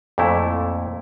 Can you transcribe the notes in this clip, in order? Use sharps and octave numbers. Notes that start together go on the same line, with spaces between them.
F2 A#2 A3 E4